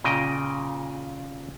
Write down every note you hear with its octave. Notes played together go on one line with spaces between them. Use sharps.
A#2 C#3 D#5 G5